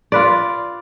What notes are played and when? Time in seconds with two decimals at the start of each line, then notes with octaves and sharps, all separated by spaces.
0.12 F4 B4 D5